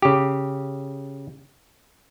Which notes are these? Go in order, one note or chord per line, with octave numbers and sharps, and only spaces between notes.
C#3 G4